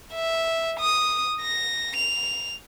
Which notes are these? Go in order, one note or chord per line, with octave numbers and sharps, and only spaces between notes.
E5
D#6
A#6
F7